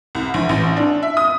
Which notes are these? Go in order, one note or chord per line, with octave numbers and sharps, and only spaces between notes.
C2
A#1
A1
D4
E5
D#6